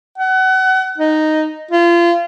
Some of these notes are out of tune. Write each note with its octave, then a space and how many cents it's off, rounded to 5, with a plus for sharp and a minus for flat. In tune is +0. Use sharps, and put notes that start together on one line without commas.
F#5 +30
D#4 -5
F4 -30